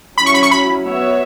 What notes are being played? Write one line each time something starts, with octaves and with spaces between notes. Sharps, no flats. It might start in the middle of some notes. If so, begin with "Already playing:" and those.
F#3 C#4 E4 B5
C#6
B5
C#6
B5
B3 F#4 C#5 E5